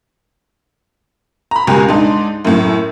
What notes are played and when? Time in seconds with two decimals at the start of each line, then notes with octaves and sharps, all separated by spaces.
1.51 A#5 B5
1.67 C#2 B2 G4 A#4 G#5 A#5
1.89 G#2 D4 D#4
2.45 F#2 A2